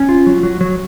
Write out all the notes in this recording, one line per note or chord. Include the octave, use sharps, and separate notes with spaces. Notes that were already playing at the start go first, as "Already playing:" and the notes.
Already playing: C#4
F4
F#3
F#3
F#3